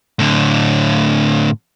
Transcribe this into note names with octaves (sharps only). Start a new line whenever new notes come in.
A2 D3